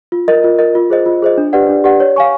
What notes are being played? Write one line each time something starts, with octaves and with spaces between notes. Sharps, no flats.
F4
A#4 D#5
F4
A#4 D#5
F4
G#4 C5 D#5
F4
G#4 C5 D#5
D4
G4 B4 D5 F#5
D4
G4 B4 D5 F#5
C#5
F5 G#5 C#6